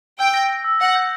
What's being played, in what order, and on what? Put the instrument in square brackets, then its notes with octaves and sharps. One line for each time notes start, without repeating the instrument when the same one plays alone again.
[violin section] G5 [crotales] E6
[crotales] A#6
A#6
E6
[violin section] F#5 [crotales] A#6
[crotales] G6